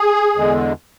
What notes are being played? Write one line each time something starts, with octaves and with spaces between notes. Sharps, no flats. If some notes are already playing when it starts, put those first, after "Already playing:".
Already playing: G#4
E2 D3 G#3